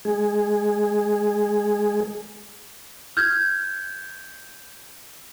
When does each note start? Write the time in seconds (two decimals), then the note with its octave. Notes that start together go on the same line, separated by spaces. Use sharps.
0.05 G#3 G#4
3.17 F6 G6 G#6